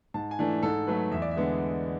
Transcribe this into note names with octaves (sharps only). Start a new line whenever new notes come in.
G#2 A5
G#5
E3 A3 D4
G#2 A4
F#3 A3 B4
E2 E5
D5
E5
D3 G#3 B3